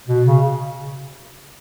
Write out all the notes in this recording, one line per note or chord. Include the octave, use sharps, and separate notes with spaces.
B2
C#3